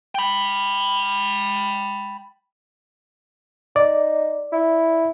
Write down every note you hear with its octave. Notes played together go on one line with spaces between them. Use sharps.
G5 B5
D#4 D5
E4